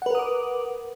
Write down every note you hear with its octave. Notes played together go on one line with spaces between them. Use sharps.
A#4 B4 F#5 D6 D#6